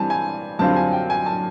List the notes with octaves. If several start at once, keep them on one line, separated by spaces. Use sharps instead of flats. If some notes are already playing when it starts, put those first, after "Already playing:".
Already playing: G2 E3 G3 C4 G#5 A5
G#5
F#2 D3 G3 C4 F4 A5
G#5
G5
G#5
A5